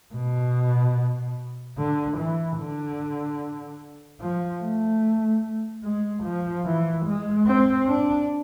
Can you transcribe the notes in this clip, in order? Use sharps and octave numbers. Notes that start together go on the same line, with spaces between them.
B2
D3
E3
D3
F3
A3
G#3
F3
E3
G#3
C4
D4